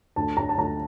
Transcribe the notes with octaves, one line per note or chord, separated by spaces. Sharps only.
D2 A5
D2 A#5
A5
D2 A#5